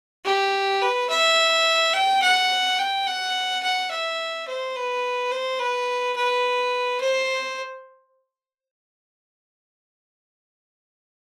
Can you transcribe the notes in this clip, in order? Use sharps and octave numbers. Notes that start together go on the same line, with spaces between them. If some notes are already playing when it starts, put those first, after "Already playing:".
G4
B4
E5
G5
F#5
G5
F#5
F#5
E5
C5
B4
C5
B4
B4
C5